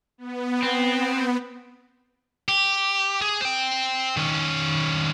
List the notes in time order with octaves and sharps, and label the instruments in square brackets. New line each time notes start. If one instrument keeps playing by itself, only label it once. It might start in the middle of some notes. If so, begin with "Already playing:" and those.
[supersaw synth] B3
[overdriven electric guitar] C4
[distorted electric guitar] G4
G#4
C5 G5
D#3 C#4